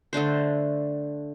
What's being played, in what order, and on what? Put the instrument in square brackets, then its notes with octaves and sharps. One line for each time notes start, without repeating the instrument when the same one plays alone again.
[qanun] D3 A3 D4 C5